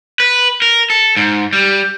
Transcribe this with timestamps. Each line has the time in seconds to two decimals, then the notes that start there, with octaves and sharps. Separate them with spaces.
0.20 B4
0.62 A#4
0.90 A4
1.17 G#2
1.53 G3